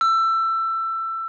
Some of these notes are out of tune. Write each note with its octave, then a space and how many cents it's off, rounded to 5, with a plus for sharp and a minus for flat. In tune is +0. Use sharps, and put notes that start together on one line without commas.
E6 +20